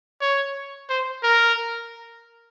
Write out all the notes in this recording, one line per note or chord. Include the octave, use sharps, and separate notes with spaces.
C#5
C5
A#4